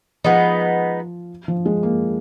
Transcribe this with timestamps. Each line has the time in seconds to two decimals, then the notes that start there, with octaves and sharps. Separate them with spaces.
0.24 F3 G#3 B3 D#4
1.48 F3
1.66 G#3
1.83 A#3